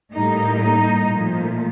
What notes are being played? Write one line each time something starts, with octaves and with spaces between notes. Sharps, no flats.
A2 G3 A#3 D#4
D#4
A#2 F3 A3